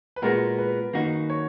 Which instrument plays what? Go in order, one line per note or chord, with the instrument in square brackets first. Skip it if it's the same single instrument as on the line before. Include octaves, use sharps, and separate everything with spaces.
[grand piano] B4
[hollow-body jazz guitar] A#2 G#3 B3 F#4 [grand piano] A#4
[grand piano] B4
[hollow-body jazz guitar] F#2 D#3 A#3 D#4 F#4
[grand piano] C#5